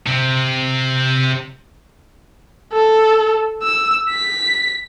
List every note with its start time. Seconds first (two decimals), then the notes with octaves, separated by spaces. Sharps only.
0.07 C3 C4
2.72 A4
3.63 E6
4.10 B6